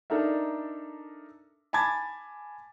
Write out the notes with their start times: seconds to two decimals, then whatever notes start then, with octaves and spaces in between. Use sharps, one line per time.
0.10 D4 D#4 A4 A#4 E5
1.73 G#5 A5 B5 D6 G#6 A6